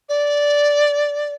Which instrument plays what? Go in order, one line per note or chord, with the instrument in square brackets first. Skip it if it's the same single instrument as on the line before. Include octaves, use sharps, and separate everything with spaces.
[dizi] D5